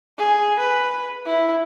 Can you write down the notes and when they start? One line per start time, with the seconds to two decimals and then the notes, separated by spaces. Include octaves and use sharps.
0.18 G#4
0.59 B4
1.26 E4